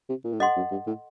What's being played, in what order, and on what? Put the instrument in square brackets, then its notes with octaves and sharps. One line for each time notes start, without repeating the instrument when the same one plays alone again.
[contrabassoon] C3
A#2
A2
[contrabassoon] G2 [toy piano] A4 D#5 F#5 C6
[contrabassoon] F#2
G2
A2